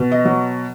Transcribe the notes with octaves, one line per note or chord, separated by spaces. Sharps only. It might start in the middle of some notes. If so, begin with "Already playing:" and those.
Already playing: B2
D#5
F#3